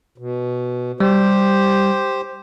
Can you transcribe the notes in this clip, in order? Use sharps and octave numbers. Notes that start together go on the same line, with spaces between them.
B2
G3 G4 C5